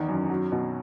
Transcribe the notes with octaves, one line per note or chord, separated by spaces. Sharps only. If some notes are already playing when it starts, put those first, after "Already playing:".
Already playing: E2 D#3
F#2
F#3
B2